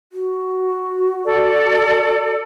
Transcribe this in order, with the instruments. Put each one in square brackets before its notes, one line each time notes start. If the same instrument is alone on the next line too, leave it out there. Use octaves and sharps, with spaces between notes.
[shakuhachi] F#4
[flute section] A4 D5